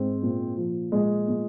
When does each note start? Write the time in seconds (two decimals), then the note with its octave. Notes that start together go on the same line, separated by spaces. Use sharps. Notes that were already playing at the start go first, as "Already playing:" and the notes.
Already playing: G#2 C4
0.23 A#2
0.57 F3
0.92 A#2 G#3
1.28 A#2